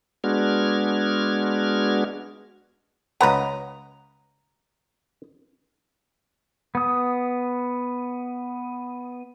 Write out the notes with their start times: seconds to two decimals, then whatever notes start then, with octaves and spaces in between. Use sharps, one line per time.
0.24 G#3 B3 D4 F#4 F6 G#6
3.20 C#2 B4 F#5 A#5 D#6
6.75 B3 D#6